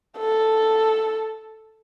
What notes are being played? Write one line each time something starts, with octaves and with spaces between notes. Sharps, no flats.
A4